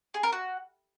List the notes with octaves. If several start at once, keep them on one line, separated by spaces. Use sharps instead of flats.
G#4
A#4
F#4